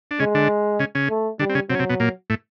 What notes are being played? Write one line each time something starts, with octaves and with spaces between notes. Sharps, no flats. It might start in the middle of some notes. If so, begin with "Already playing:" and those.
D4
C#3 G#3 C#4
D3 D4
C#3 C#4
C#3 C#4
A3
D3 G3 D4
C4
C#3 C#4
C3 F#3 C4
C#4
C3 C4
B2 B3
A#2 A#3
A2 A3